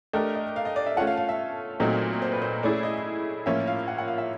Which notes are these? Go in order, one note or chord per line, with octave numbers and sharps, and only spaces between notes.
A3 D4 G4 A#4 D#5
D#5
F5
D#5
D5
E5
A3 C#4 F4 A4 F#5
F5
F5
E5
A#2 F#3 A3 C4 D#4
C5
B4
C5
A3 C#4 E4 G#4 D5
D#5
A2 F3 A#3 C#4 F4 E5
F5
F#5
F#5
F5
E5